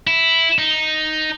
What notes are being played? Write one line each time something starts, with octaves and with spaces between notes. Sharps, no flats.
E4
D#4